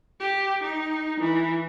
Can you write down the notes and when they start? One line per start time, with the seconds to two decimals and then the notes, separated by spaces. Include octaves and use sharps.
0.19 G4
0.62 D#4
1.20 E3